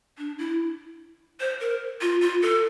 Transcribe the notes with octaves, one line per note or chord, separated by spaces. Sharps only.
D4
E4
C5
A#4
F4
F4
A4